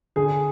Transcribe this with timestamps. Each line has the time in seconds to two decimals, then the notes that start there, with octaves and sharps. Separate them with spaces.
0.16 D3 G#4